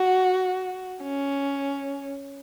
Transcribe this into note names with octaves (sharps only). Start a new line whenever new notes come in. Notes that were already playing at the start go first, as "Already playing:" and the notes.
Already playing: F#4
C#4